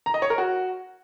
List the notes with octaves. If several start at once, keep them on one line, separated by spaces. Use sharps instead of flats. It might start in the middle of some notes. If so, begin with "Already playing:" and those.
A#5
D#5
C#5
A#4
F#4